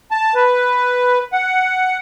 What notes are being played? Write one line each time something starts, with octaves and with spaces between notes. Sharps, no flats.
A5
B4
F#5